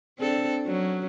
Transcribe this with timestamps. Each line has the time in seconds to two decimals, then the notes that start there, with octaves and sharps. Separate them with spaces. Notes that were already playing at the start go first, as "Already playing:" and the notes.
0.19 C4 D4 A4
0.66 F#3 C#4